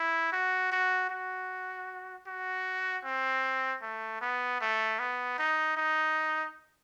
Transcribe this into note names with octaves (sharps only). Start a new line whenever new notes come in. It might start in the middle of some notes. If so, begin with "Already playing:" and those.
Already playing: E4
F#4
F#4
F#4
F#4
C4
A3
B3
A3
B3
D#4
D#4